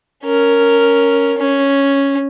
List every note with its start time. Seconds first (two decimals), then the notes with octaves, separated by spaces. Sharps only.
0.25 C#4 A#4
1.38 C#4